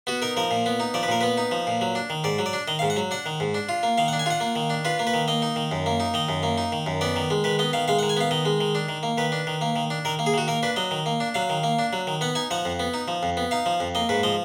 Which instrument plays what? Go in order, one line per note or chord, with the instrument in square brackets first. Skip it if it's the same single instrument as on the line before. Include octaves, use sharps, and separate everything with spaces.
[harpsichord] B3 F#4
D#4 A#4
F3 A#4
A#2
B3
D#4
F3 D5
B4
A#2 A#4
B3 B4
D#4
F3
A#2
F#3
D4
D#3
G#2 D5
F#3
D5
D4
D#3 D#5
F5
G#2
F#5
F#3
D4 F#5
D#3
G#2
D4
F4
A#3
D#3 F5
F#5
D4
G#5
F4 F#5
A#3
D#3
D4
F4 B4
A#3
B4
D#3
A#3 D#5
D#4
D#3
F#2
A#3
D#4
D#3 D#5
F#2
A#3
D#4
D#3
F#2
B3 D5
D#3
G#3
D#3 B4
B3 D#5
D#3 F5
G#3 F5
F#5
D#3
G#5
B3 F5
D#3 D#5
G#3
D#3
D4
D#3
A#3
D#3 B4
D4
D#3
A#3
D#3
D4
D#3 A#4
A#3
G#4
D#3 F#4
A#3 A#4
D4 B4
F#3 D#5
D#3
A#3
D4
F#3 F5
D#3
A#3
D4
F#3
D#3
B3 F#5
D#4 G#5
F3 F#5
F2
B3
D#4
F3
F2
B3
D#4 F5
F3
F2
A#3 D#5
G#2 B4
F3 D#5